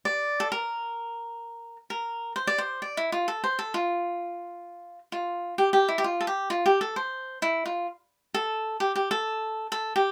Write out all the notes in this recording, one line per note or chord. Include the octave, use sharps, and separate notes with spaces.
D5
A4
A#4
A#4
C5
D5
C5
D5
E4
F4
A4
C5
A4
F4
F4
G4
G4
E4
G4
F4
A4
G4
F4
G4
A4
C5
E4
F4
A4
G4
G4
A4
A4
G4